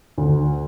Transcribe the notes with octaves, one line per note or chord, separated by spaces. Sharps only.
D2